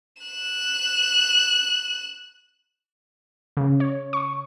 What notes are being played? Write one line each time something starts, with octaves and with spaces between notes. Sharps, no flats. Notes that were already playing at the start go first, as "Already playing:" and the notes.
F#6 E7
C#3
C#5
C#6